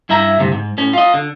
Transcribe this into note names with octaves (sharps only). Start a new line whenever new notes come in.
G2 E4 E5 A#5
D2 G2 C3
G#2
A2 C#4
F4 D#5
D3